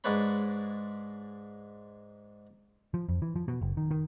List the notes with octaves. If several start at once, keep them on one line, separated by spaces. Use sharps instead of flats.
G#2 G#3 D4 B4 C#5 B5
F3
F2
E3
F3
B2
F#1
D#3
D#3